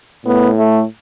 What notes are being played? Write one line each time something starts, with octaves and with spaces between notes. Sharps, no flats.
A2 B3
A3